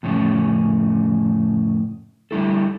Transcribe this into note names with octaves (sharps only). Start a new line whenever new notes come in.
F2 A2 C#3 C#4
D3 G3 E4 A4